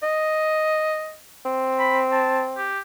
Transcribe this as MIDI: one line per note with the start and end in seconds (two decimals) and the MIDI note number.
0.03 1.15 75
1.45 2.69 60
1.79 1.99 83
2.12 2.41 81
2.56 2.79 67